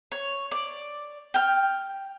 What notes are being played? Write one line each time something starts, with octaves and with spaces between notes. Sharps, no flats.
C#5
D5
G5 F6